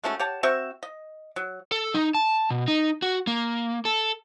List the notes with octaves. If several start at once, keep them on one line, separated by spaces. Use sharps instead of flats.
G#3 A3 C#4 F#4
G4 C#5 F#5 A5
C4 F#4 E5 C#6
D#5
F#3
A4
D#4
A5
B2
D#4
F#4
A#3
A4